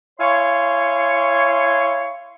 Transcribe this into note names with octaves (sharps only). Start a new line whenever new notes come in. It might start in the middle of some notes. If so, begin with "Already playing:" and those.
E4 C#5 F5 G#5 C6 C#6